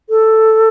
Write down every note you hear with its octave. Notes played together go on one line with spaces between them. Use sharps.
A4